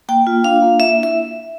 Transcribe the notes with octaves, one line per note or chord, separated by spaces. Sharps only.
A#3 G5
F4
D4 F5
A#3
A#3 E5
E4
E5